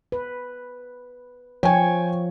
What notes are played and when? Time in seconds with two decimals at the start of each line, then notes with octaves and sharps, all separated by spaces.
0.12 B4
1.63 F3 C#5 G5 G#5